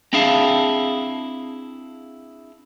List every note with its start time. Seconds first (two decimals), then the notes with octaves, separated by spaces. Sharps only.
0.13 C4 D4 E4 G#4 F5 A5